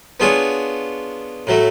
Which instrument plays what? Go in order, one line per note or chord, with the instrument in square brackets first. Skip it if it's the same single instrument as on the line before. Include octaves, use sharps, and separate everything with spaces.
[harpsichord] B3 D4 F4 G#4 C#5
A2 F#3 A3